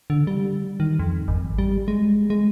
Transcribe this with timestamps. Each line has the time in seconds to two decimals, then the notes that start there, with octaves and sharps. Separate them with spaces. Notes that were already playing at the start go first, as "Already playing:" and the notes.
0.10 D3
0.27 G3
0.80 D#3
0.99 F2
1.28 G#1
1.58 G3
1.88 G#3
2.30 G#3